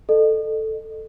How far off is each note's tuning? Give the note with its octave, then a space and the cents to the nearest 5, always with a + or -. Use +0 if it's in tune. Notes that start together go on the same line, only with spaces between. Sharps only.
A4 +0 D#5 -35